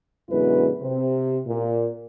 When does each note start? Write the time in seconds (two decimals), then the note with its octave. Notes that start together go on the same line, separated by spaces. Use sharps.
0.30 F#2 B2 D3 G#3 E4 B4
0.81 C3 C4
1.46 A#2